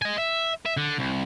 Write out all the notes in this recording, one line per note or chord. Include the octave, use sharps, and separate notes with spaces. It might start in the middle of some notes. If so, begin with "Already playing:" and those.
D#5 G#5
E5
E5
D3
C2